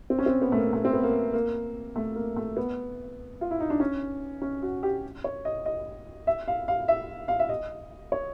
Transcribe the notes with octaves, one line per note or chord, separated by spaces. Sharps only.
C4
C#4
C4
B3
A3
A#3
A3
C4
B3
A#3
A#3
A3
A#3
A3
B3
F4
E4
D#4
D4
C#4
C#4
F#4
G4
C#5
D#5
D#5
E5
F5
F5
E5
F5
E5
D#5
C#5